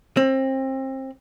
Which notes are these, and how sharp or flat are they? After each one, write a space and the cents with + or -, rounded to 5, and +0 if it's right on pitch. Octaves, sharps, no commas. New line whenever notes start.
C4 +30